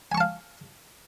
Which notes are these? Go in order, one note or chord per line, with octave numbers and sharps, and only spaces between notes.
F5 G#5 A5 C#6